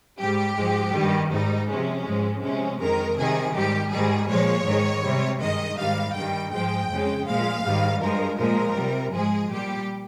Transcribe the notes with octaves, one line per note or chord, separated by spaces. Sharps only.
G#2 G3 G4
G#2 F3 G#3
G2 D#3 G3
G#2 G3 D#4
C3 F3 G#3 C#4
G#2 F3 G#3
C3 F3 G#3 C#4
F2 D#3 G#3 A#4
C3 D#3 G3 G#4
G#2 D#3 G3 G4
G#2 D#3 G3 G#4
A#2 F3 G#3 C#5
G#2 D#3 G#3
C3 G3
G2 D#3 G#3 D#5
G#2 D#3 G3 F5
G2 D#3 G3 G5
G#2 F3 G#3 G5
F2 C#3 G#3
A#2 F3 G#3 F5
G#2 D#3 G3
G2 F3 G#3 A#4
A#2 F3 G#3 A#4
C3 G3
G#2 F3 G#3 G#4
A#2 G3 G4